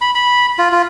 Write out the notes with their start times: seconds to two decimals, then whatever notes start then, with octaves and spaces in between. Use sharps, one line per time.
0.01 B5
0.15 B5
0.59 F4
0.72 F4